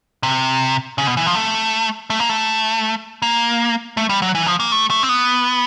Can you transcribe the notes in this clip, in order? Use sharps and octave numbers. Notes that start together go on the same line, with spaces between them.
C3
C#3
B2
E3
F3
A3
A3
A#3
A3
A#3
A3
G3
F#3
E3
F3
A#3
A3
A3
C4
B3